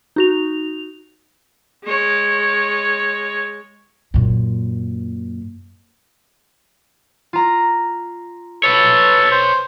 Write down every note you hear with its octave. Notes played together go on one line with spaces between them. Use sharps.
D#4 F#4 F7
G#3 C#5
F#2 A#2
F4 A#5
A4 B4 C#5
C5